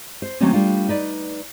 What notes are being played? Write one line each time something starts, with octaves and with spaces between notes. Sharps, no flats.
C5
D#3 F#3 A3 A#3 C4 C#4
G3 A3 D4 F4
D#4 B4 D5